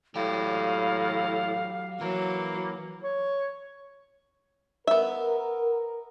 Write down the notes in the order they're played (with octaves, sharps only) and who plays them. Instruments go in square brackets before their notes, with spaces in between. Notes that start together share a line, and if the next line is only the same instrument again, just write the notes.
[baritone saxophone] A2 [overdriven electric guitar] F#3 G4 [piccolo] F5
[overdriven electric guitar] E3 [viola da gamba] F#3 [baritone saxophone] A#3
[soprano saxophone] C#5
[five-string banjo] B3 E5 [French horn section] A#4